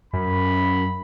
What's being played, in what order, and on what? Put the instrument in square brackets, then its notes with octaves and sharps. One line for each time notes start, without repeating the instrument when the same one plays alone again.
[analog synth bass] F#2 [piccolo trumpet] B5